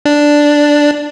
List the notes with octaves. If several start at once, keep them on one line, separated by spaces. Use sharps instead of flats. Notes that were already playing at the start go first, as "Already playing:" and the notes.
D4